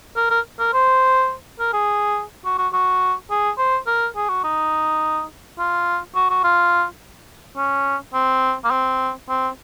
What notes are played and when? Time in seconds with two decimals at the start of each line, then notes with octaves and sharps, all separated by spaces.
0.16 A#4
0.30 A#4
0.59 A#4
0.73 C5
1.59 A#4
1.73 G#4
2.45 F#4
2.58 F#4
2.73 F#4
3.30 G#4
3.58 C5
3.87 A#4
4.16 G#4
4.29 F#4
4.44 D#4
5.58 F4
6.15 F#4
6.30 F#4
6.44 F4
7.57 C#4
8.14 C4
8.64 A#3
8.71 C4
9.29 C4